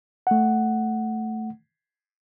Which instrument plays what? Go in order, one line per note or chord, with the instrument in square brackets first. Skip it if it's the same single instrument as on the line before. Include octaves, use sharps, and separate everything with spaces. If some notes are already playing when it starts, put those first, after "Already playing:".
[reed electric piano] A3 F#5